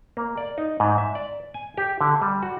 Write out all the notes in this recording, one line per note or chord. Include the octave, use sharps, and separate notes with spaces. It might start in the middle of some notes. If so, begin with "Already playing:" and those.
A#3
D5
D#4
G#2
E5
D5
G#5
G4
D3
G3
F#4